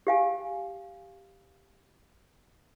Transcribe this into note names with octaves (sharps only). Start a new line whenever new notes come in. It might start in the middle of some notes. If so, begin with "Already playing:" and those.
G4 F5 G#5